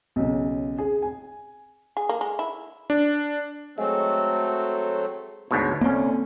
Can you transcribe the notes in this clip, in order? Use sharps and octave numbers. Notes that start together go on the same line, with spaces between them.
B1 C#3
G#4
G#5
G#4
A#3
G#3
E4
D4
F#3 G#3 A3 C4
D2 G#2 B2 C#5
C2 D3 A#3 C4 C#4